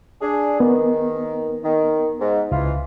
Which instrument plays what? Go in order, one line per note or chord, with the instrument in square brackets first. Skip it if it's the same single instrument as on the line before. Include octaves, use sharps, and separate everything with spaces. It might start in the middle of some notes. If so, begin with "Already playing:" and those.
[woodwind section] D4 G#4
[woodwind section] D#3 [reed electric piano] B3
[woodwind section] D#3
G#2
[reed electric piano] C#2 [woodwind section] E3 F4